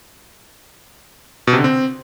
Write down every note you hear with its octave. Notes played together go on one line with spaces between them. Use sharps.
B2
C3
D3
C4